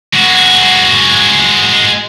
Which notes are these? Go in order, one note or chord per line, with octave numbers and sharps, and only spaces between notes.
G#3 F#4